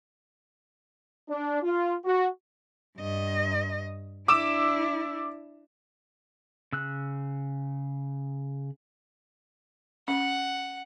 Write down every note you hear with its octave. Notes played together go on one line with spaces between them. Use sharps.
D4
F4
F#4
G2 D#5
D4 E4 D6 E6 E7
C#3 E6 F#6
C#4 F#5